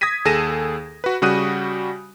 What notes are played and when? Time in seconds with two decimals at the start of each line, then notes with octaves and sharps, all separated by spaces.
0.01 D#6 G#6 A#6 B6 D#7
0.25 D#2 G#4 A4 A#6 D#7 E7
1.04 F#4 B4
1.22 C#3 G3 F#4 D#6 F#6 D#7